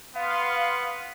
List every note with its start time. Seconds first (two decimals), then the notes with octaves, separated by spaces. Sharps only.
0.16 B3 F5 C6